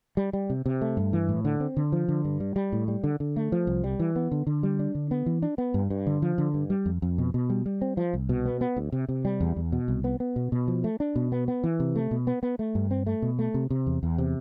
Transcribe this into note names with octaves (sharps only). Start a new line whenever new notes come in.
G3
G3
C3
C3
A3
G2
E3
A2
D3
C4
D3
F3
D3
G2
G3
G3
A2
G3
D3
D3
A3
F3
C2
G3
E3
B3
D3
D3
G3
D4
D3
B3
E3
D4
B3
G2
G2
D3
F3
D3
G2
G3
F2
F2
B2
B2
G3
G3
C4
F3
C2
B2
B3
B3
D2
C3
C3
G3
E2
E2
B2
C2
B3
B3
B2
B2
F3
A3
D4
B2
B3
B3
E3
C3
A3
B2
B3
B3
A3
G2
C4
A3
B2
A3
C3
C3
E2
E2
C3